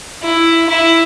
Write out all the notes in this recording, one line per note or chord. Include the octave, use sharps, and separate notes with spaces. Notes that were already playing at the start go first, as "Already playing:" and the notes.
E4
E4